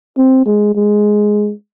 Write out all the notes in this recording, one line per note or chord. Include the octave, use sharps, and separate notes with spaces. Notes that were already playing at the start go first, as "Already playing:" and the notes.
C4
G#3
G#3